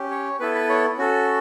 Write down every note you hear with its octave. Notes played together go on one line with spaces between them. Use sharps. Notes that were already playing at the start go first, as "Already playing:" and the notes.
Already playing: C#4 G4
C#5
B3 E4 A4 B4
B4
C#5
C#4 F#4 A4